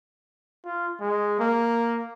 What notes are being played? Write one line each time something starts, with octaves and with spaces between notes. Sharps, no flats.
F4
G#3
A#3